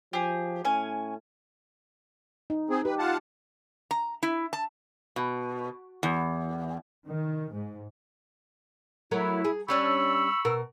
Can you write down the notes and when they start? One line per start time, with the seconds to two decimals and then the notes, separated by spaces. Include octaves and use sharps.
0.13 F3 G4 G#4
0.65 A2 C#4 G#5
2.50 D#4
2.70 C4 G#4
2.85 G4 B4
2.99 F4 F#5 A5
3.91 A#5
4.23 E4
4.53 A5
5.16 B2
6.03 E2
7.07 D#3
7.52 G#2
9.11 F#3 A3 E4 A#4
9.45 G#4
9.68 G3 C#4 D4 B5 C#6 E6
10.45 B2 A#4